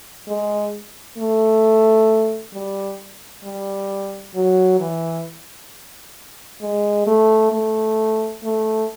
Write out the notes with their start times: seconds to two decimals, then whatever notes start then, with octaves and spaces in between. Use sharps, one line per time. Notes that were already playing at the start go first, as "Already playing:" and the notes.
0.28 G#3
1.18 A3
2.53 G3
3.44 G3
4.34 F#3
4.80 E3
6.61 G#3
7.07 A3
7.52 A3
8.43 A3